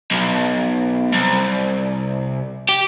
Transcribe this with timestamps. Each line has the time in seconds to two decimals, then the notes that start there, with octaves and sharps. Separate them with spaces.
0.11 B1
1.13 C2
2.69 G4